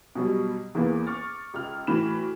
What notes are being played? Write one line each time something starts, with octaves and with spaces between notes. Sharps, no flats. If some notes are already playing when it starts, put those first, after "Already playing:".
B2 F#3 G3
E2 E3 A#3 B3
C#6 D6 F6 A6
C#2 F6
A2 E3 F#4 B5 E7